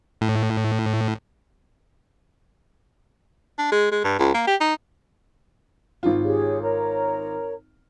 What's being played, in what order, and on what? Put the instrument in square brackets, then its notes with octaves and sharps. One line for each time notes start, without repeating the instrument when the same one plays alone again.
[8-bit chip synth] A2
[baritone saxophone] D4
G#3
G#3
G2
C#2
A#3
G4
D#4
[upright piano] G#1 F4
[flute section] G4 G#4 C#5
A#4 C#5 A#5